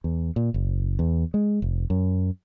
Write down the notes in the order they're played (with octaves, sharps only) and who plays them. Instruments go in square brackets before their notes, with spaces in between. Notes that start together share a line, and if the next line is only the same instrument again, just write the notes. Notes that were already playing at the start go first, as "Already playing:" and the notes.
[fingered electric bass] E2
A#2
F#1
E2
G#3
F1
F#2